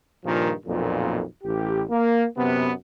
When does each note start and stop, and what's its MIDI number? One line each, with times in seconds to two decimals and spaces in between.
0.24 0.52 43
0.24 0.52 46
0.24 0.52 51
0.24 0.52 53
0.66 1.22 35
0.66 1.22 41
0.66 1.22 46
1.44 1.83 33
1.44 1.83 67
1.90 2.25 58
2.37 2.71 42
2.37 2.71 48
2.37 2.71 59